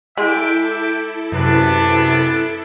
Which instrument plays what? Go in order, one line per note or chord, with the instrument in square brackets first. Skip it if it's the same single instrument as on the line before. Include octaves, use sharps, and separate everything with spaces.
[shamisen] G#3 [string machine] E4 A4 [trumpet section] E5 G5 D6
[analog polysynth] F#2 C3 B4 [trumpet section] B3 D4